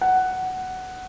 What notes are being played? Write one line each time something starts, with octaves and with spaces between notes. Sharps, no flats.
F#5